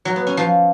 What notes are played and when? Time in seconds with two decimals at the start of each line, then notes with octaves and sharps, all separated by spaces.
0.05 F#3
0.16 B3
0.27 C#4
0.37 F3